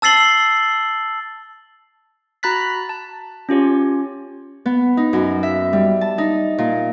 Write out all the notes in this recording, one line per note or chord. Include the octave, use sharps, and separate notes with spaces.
A5 E6 A6 C7 F#7 G7
F#4 A#5 B5 F#6 A6 B6
A5
C#4 F4 G4 C#5
B3
D#4
F#2
E5
G3
A5
D#4
A#2